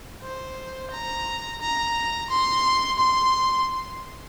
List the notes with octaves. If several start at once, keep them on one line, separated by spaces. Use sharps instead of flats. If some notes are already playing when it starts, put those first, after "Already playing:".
C5
A#5
A#5
C6
C6